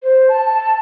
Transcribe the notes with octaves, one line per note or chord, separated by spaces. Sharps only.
C5
A5